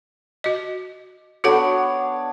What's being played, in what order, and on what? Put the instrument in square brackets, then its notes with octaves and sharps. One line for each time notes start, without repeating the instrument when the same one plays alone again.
[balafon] F#4 D#5
[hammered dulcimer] B3 D4 C#5 [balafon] F#4 A4 F#5